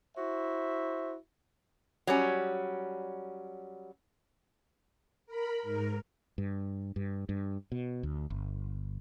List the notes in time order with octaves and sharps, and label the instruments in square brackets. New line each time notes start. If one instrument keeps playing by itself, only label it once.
[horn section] E4 F#4 C5 E5
[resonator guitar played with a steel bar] F#3 G3 C#4
[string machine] A#4 B5
G#2 A#4
[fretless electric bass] G2
G2
G2
B2
D2
G1